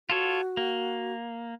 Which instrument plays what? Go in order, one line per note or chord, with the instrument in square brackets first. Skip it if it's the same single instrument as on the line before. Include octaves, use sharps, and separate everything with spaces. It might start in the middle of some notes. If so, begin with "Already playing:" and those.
[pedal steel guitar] F4 A4 C#5 [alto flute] F#4
[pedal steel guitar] A#3